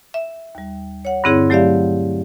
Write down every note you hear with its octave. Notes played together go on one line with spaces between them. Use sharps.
E5
D#2 G3
C#5 F#5
G2 D3 C4 E4 G#4 C#5
F#3 A3 G4 D5 E5 F5